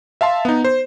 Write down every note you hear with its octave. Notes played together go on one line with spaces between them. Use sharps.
E5 F5 A5 C6
B3 D#4
C5